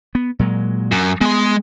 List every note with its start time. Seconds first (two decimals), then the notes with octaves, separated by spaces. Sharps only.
0.15 B3
0.39 A#2 F#3 G#3
0.92 F#2
1.21 G#3 B3 C6